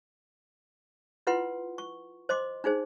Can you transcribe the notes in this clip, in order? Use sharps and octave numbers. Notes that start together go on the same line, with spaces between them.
E4 F4 B4 F#5 C6
C#6
C5 D#5 C6 D6
D4 D#4 G#4 C5